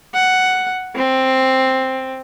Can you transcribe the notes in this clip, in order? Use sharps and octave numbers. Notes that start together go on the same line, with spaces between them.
F#5
C4